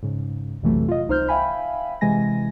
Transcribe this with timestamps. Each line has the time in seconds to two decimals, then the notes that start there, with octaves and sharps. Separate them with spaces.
0.03 G#2 C#3
0.62 A#1 F2 C3 E3 F#3 A3
0.88 F4 D#5
1.08 C2 D#4 C5 F6 G6
1.28 E5 F5 G5 G#5 B5
2.01 C3 E3 G#3 G#5 A#6